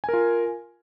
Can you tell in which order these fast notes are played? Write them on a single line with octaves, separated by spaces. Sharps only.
G#5 A#4 F4